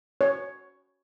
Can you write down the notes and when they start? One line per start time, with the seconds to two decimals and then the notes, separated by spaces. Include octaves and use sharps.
0.21 C#5